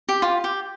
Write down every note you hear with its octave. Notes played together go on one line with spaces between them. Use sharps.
G4
F4
G4